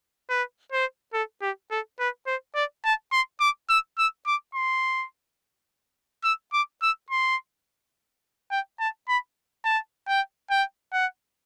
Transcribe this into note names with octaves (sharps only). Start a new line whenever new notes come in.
B4
C5
A4
G4
A4
B4
C5
D5
A5
C6
D6
E6
E6
D6
C6
E6
D6
E6
C6
G5
A5
B5
A5
G5
G5
F#5